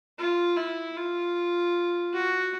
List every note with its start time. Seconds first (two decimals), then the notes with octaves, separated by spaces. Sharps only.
0.18 F4
0.57 E4
0.96 F4
2.14 F#4